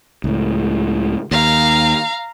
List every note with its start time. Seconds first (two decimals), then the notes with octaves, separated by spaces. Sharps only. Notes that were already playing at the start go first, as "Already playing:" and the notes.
0.24 C#2 A2
1.31 D#2 F5 A#5